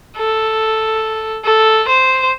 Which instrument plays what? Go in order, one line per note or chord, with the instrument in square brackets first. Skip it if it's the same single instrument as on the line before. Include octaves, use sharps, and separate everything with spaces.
[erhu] A4
A4
C5